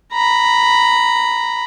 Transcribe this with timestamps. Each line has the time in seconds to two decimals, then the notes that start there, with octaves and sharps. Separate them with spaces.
0.12 A#5 B5